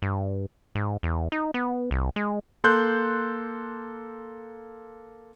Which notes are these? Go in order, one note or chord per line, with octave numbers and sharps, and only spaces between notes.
G2
G#2
E2
D#4
B3
C2
G#3
A#3 A4 C6 F#6 G6